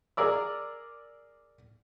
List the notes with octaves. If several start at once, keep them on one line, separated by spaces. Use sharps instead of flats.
G#4 A#4 D5 E6